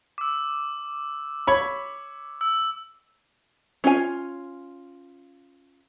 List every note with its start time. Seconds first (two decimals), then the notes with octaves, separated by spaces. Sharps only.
0.18 D6 E6
1.47 C#5 B5
2.41 E6
3.84 C#4 F4 G#5